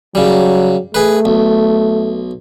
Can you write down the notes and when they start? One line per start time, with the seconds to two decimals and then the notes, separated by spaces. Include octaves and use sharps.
0.15 C#3 F#3 G3
0.94 A3 G#4 B4
1.25 B1